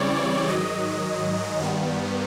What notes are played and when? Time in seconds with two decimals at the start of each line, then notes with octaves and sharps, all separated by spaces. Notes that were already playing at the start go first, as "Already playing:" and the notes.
Already playing: C#3 E3 G3 C4 C#5 D5
0.48 G#2 D#3 F#3 D#5
1.59 G2 D#3 G3 B3